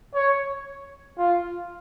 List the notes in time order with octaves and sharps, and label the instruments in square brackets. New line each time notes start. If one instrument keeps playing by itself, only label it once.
[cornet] C#5
F4